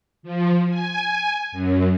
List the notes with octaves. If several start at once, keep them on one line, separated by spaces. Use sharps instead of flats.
F3
G#5
F#2